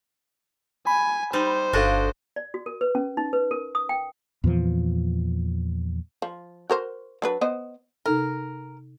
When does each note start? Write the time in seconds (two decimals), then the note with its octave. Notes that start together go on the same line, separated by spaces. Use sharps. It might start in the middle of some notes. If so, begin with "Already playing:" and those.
0.87 G#5 B5
1.33 G3 D#4 C5
1.73 G1 D4 F#4 A4 D#5 F5
2.36 D5
2.54 F#4
2.66 A#4
2.81 B4
2.95 C#4
3.17 D#4
3.33 B4
3.51 A#4
3.75 D#6
3.89 G5
4.44 E2 A#2 E3 F3
6.22 F3
6.70 F#4 A#4 C5
7.22 F#3 D4 B4
7.41 B3 C5 D#5
8.06 C3 D#4 A4 A#4